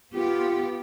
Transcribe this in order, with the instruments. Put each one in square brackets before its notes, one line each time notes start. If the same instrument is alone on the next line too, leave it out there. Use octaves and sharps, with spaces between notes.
[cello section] B3 G4 [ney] F4